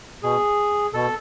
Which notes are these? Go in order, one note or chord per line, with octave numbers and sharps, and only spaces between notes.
B2 G#4
B2 A4